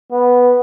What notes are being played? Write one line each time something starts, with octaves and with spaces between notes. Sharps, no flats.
B3